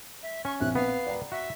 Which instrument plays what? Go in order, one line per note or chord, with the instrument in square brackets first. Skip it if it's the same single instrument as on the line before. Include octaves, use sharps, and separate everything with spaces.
[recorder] E5
[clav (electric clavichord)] C#4 [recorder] C#6
[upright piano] A#1 C4 E5 [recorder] F#6
[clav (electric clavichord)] B3 [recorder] F5
[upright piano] D5 G5 A#5
[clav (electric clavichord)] F#4 [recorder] E5